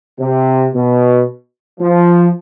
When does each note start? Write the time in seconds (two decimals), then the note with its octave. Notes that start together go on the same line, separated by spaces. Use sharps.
0.20 C3
0.74 B2
1.80 F3